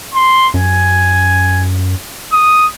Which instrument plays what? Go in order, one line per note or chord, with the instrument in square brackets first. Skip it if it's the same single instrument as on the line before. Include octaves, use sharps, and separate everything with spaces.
[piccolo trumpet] C6
[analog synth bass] F#2 [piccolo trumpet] G#5
[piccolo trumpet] D#6